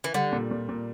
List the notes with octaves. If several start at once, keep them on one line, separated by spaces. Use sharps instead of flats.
E3
D3 G3
A#2
A#2
A#2